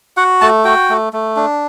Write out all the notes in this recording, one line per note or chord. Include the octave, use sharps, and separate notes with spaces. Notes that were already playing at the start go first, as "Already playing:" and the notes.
F#4 F#5
A3 A5
F#4 G5
A3
A3
D4